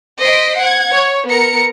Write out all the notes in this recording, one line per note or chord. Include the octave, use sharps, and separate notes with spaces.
C5 D#5 B6 C7 D7
F#5 G#6
C#5
B3 A#4 A#5 C#7